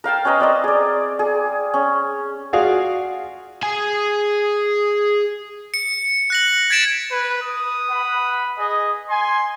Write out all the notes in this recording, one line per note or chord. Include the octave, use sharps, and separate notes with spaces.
A#4 F5 G5 A5
C#4 B4 D#5 A#5
C4 D5 D#5
G#4 D5
G#4
C#4
F4 F#4 G#4 D5 F5
G#4 G#5
C#7
F#6 A#6 F#7
G#6 A6 B6 D7 E7
B4
D#6
B4 F#5 B5
G#4 D#5
G#5 C6